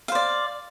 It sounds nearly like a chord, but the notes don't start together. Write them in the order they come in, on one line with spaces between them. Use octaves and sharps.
F5 C5 D5